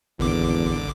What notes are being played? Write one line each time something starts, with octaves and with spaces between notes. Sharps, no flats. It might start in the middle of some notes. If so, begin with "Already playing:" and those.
G#1 E2 D3 D6